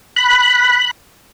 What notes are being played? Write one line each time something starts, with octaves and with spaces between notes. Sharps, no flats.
B5 F#6